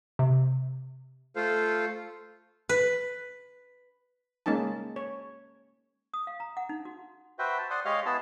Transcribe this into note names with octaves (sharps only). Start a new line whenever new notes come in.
C3
A3 F4 A4 C5 F5
B4
G#3 A#3 C#4 D#4 A5
C#5
D#6
F5
A#5
F#5
D#4
F#4
F#4 B4 C5 E5 G5
A5
C5 D5 F#5 C6 D#6
G#3 G4 C#5 D#5 F5 F6
B3 E4 G#4 A5 E6